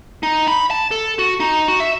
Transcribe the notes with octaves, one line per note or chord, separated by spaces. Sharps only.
D#4
B5
A5
A4
F#4
D#4
F#4
E5